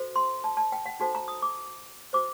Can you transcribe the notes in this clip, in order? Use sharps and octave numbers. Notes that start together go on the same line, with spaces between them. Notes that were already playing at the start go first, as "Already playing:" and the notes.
Already playing: F#4 A4 C5
C6
A5
A5
G5
F#5
D#4 F#4 A4 C5 A5
A#5
D#6
D6
F#4 C5 D6